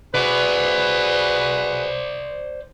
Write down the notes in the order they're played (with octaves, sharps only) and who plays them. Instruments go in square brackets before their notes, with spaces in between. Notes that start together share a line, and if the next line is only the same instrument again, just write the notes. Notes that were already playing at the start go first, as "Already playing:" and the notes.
[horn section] F#4 G#4 B4 [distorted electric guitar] C5 D5